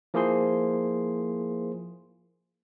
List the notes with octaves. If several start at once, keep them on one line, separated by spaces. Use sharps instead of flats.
F3 A#3 E4 G#4 C5 C6